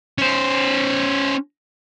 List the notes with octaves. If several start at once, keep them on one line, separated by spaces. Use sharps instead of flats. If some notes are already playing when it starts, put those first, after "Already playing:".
C#4 C5